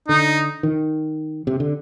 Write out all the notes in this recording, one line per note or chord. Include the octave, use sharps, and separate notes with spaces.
D3 D#4
D#3
C3
D3